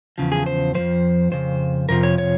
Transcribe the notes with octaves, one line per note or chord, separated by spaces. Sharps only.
E2 C#3 F3
G#4
C5
F2 C#3 F3 C5
F2 C#3 C5
F2 C3 F3 A#4
C#5
C#5